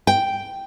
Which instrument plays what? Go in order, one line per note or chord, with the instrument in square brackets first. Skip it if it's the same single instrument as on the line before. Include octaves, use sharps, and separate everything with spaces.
[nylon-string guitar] G5